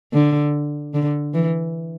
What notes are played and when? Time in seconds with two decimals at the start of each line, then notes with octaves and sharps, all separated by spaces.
0.13 D3
0.94 D3
1.34 E3